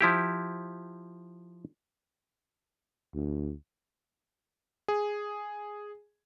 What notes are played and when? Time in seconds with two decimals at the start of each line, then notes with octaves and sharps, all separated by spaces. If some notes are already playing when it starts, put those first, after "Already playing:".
0.01 F3 E4 G4
3.15 D2
4.88 G#4